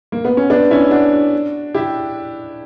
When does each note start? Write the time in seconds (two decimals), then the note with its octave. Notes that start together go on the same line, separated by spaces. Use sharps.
0.12 A#3
0.25 B3
0.37 C#4
0.50 B3 D4
0.71 C#4 E4
0.91 D4 F#4
1.74 E4 G4